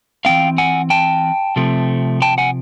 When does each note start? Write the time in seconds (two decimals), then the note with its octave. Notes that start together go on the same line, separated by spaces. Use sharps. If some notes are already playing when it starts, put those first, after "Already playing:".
0.25 E3 G#3 C4 F5 G5
0.58 F#5 G#5
0.90 G5 A5
1.56 C3 F3 A3 C4
2.22 G5 A5
2.38 F#5 G#5